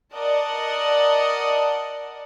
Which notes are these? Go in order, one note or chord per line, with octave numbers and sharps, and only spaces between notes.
A#4 D5 D#5 F#5 A5